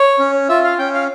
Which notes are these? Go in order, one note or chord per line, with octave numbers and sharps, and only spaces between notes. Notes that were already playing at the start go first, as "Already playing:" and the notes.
Already playing: C#5
C#4
F4 E5
F5
C#4 G5
F5